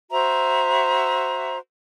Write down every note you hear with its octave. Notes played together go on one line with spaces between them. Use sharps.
F#4 C5 E5 A#5